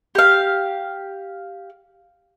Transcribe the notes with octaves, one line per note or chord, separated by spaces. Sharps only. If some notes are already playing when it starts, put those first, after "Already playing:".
G4 F5